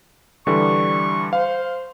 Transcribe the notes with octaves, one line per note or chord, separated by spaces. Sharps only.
D3 E3 G3 C#6
C5 F5